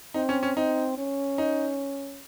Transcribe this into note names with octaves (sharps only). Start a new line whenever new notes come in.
C4 D#4
C#4
C#4
C4 D#4
C#4
D#4